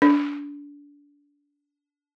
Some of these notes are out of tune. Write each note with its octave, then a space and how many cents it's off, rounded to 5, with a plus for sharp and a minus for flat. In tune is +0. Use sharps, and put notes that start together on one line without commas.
D4 -30